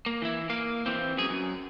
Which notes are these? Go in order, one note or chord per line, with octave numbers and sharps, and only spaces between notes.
A#3
E3 E4
A#3 F5
E3 C4
F#2 G#4
F#2